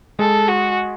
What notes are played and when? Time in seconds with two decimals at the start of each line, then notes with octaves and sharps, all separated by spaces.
0.19 G#3 G#4 A4
0.48 F#4